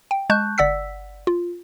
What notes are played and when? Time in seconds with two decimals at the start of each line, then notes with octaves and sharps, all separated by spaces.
0.11 G5
0.30 G#3 A5 C#6 F#6 G6
0.58 G1 D5 F#5 E6 B6
1.27 F4